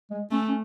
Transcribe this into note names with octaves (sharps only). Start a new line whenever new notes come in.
G#3
A3 C#4
C#4